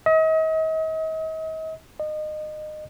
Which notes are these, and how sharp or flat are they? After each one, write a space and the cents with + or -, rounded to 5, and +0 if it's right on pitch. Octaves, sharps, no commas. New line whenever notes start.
D#5 +40
D#5 -25